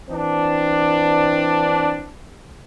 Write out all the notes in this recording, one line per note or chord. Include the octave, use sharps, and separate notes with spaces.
E3 C4 D4